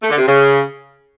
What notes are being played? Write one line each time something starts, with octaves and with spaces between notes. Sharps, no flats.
A3
D3
C3
C#3